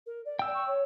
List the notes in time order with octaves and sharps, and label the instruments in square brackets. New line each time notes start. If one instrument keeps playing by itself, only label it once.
[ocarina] A#4
D5
[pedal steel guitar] G5 E6
[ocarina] C#6
C#5